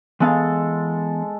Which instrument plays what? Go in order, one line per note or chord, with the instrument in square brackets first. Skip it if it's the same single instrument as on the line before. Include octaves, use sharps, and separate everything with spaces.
[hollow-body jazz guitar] E3 B3 F5 [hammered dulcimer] G#3 A4